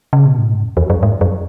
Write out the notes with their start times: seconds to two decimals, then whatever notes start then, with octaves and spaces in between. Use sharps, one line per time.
0.13 C#3
0.26 B2
0.38 A2
0.51 G#2
0.63 F#2
0.77 E2
0.90 F#2
1.03 G#2
1.21 F#2